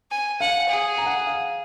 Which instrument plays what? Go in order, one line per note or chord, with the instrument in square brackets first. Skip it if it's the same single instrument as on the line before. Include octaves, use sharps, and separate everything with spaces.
[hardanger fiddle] G#5
[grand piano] F5 [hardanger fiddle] F#5
[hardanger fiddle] G#4
[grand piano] A#5
F#5
F5